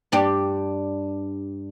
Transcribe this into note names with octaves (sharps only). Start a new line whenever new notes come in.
G2 D4 G4